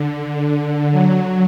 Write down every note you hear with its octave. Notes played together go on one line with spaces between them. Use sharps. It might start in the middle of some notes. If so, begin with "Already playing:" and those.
Already playing: D3
D3
F#3